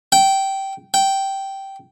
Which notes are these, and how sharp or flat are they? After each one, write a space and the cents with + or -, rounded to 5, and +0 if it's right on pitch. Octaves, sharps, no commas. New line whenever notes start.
G5 -15
G5 -10